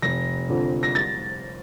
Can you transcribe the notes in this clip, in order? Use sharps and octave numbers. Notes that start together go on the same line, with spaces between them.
F1 A#6
F2 D3
A#6
A6